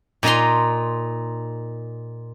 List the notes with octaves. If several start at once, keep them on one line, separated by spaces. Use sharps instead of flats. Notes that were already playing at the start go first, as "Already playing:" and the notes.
A#2 D#4 D#5 A#5 C6